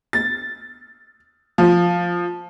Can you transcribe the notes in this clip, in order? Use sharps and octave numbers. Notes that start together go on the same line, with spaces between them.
A6
F3